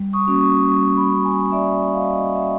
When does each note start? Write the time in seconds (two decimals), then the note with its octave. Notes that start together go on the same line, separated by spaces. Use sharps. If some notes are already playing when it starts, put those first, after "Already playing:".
Already playing: G3
0.13 C#6 D#6
0.27 A#3 C#4 F#4
0.41 C#6 D#6
0.68 G3 C#6 D#6
0.96 B5 C#6
1.11 A#3 C#4 F#4
1.24 G#5 A#5
1.52 G3 D5 E5
1.73 D5 E5
1.94 A#3 C#4 F#4 D#5 F5
2.15 D#5 F5
2.35 G3 E5 F#5